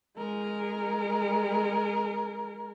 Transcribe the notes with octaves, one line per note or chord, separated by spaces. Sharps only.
G#3 A#4